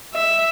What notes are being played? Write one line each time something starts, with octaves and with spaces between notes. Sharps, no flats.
E5